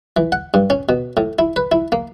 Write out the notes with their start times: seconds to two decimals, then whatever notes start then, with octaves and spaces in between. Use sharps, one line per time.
0.17 E3
0.32 F#5
0.54 G2
0.70 C#4
0.89 B2
1.17 A2
1.39 E4
1.56 B4
1.72 E4
1.92 A#3